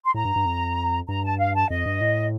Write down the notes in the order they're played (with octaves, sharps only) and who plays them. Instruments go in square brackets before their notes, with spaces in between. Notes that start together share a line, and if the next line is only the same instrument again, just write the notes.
[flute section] C6
[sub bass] A2 [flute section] A#5
[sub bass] G2
G2
F2
[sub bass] G2 [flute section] A#5
[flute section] A5
F5
A5
[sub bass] F2 [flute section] D#5
[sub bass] G2
A2